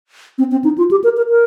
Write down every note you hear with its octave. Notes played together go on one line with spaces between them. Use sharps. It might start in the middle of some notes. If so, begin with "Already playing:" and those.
C4
C4
D#4
F4
G4
A#4
A#4
A#4